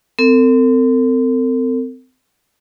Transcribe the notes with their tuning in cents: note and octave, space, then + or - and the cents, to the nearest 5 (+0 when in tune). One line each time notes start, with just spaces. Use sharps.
C4 -30 A4 +45